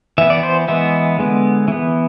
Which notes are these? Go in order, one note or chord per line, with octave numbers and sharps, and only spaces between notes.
E3 B3 E5
D5
C5
E3 G#3 B3 E5
D3 G#3 B3
E3 B3